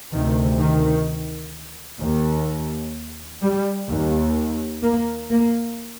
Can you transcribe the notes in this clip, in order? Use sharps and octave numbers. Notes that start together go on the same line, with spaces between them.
D2 C3 D#3
D#3
D#2
G3
D#2
A#3
A#3